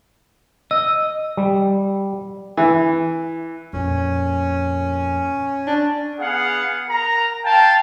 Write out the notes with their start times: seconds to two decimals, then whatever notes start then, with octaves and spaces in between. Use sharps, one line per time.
0.71 D#5 E6
1.37 G3
2.57 E3
3.73 F2 A#2 C#4
5.67 D4
6.19 B3 G#4 F5 F#5
6.89 A#4 A#5
7.44 F5 G5 A5